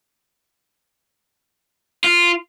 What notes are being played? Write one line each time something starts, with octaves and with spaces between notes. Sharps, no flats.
F4